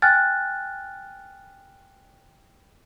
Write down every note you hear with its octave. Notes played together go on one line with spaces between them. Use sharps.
G5 G#5 F6 F#6 A6